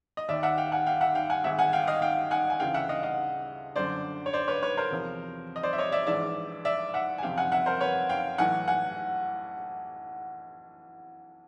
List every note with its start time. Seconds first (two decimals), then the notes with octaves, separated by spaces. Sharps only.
0.17 D#5
0.28 D#2 D#3 D5 E5
0.43 E5 F#5
0.58 F5 G5
0.72 F#5 G#5
0.86 F5 G5
1.01 E5 F#5
1.15 F5 G5
1.30 F#5 G#5
1.44 G#1 G#2 D#3 E5 F#5
1.59 F#5 G#5
1.73 F5 G5
1.87 D#5 F5
2.02 F5 G5
2.31 F#5 G#5
2.50 G#5
2.60 D2 C#3 E3 F5 G5
2.74 E5 F#5
2.89 D#5 F5
3.03 D#5 F5
3.75 G1 F#2 D3 C5 D5
4.26 C#5
4.33 C5 D5
4.48 B4 C#5
4.63 B4 C#5
4.77 A#4 C5
4.91 E2 C3 F3
5.56 D#5
5.63 C5 D5
5.73 E5
5.78 C#5 D#5
5.92 D5 E5
6.07 A#1 G#2 E3 D5 E5
6.65 D5 E5
6.94 E5 F#5
7.18 G#5
7.23 F#1 F2 C3 F3 F5 G5
7.38 F#5 G#5
7.52 E5 F#5
7.66 A#4 C5
7.81 B4 C#5
8.09 F5 G5
8.38 B1 A2 E3 F#5 G#5
8.68 F#5 G#5